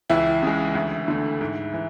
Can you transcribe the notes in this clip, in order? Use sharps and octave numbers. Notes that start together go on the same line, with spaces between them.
C#2 E3 E4
C#3 G#3
D2
D3 A3
G#2
E3